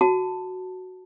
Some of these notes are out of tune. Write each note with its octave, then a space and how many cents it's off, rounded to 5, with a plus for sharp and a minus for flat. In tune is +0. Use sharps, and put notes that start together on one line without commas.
F#4 +0 A5 +5